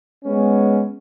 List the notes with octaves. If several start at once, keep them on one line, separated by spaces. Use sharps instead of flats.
G#3 B3 C#4